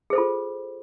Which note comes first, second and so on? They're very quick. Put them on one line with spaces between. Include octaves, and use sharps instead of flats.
G#4 C5 A4 F4